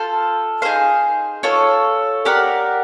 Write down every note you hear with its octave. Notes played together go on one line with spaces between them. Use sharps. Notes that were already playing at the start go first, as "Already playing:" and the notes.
Already playing: F4 A4 C5 F5
D#4 G#4 C5 F5
F4 A4 C#5
G4 A#4 D5 F#5